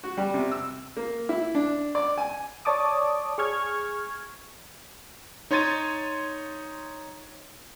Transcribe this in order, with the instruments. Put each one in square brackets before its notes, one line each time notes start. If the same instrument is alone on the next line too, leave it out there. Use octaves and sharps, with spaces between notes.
[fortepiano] F#4
G3
C3
E6
A#3
E4
D4
D5
G#5
[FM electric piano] C#5 D5 A5 D6 D#6
G#4 C#6 F6 G#6
[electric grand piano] D#4 C#5 C6 G#6 A6 D#7